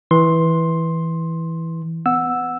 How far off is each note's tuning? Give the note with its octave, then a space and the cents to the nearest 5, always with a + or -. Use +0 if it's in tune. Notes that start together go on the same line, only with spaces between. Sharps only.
E3 -10 C6 +10
B3 +25 F#5 -10 E6 +0